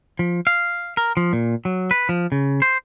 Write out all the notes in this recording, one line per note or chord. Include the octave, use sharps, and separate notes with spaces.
F3
F5
A#4
F3
A#2
F#3
B4
F3
C#3
C5